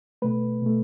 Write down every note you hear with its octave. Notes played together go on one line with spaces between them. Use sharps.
B2 A3 B4
B2 A3